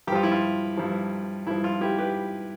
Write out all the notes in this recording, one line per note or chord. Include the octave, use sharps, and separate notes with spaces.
G2 F3 F4 G4
E4
F4
G2 F3
G2 F3 E4
F4
E4 G4
G4 B4